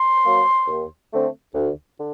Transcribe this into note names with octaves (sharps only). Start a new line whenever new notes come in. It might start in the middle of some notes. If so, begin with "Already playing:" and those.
Already playing: C6
F#3 A#3
D#2
D3 A3 C4
D2
D3